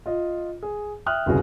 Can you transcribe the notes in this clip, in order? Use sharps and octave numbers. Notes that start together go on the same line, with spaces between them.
F4 D#5
G#4
E5 G5 D#6 F6 F#6
G1 C2 C#3 F#4 G#4